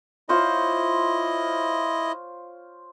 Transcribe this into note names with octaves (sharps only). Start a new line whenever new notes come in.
E4 F4 C5 C#5 D#5